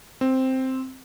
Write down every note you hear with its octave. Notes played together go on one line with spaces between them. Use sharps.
C4